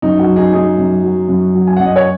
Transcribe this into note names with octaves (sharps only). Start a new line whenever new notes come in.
F#2 D#4
F#4
F#3
D#4 G#4
F#2 D#4 G#4
F#2
F#3
F#2
F#3
G#5
F#2 F#5
D#5
C#5